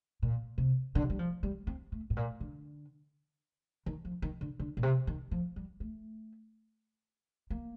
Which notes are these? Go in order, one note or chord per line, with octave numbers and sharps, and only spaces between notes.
A#2
C3
D3
G3
F3
G3
C4
A3
A2
A#2
D3
D#3
F3
D#3
D3
D3
A#2
C3
D#3
F3
G3
A3
A#3